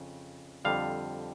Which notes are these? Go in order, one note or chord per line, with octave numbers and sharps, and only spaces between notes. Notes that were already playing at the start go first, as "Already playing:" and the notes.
Already playing: F2 C#3
F2 D3 G3 F5